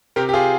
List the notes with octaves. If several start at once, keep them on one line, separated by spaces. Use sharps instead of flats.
C3 G4 A#4
G4
F4 G#4